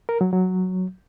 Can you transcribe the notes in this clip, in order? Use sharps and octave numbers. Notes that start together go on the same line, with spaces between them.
A#4
F#3
F#3